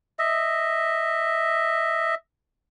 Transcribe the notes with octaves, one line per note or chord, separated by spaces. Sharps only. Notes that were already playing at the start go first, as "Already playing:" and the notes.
D#5 E5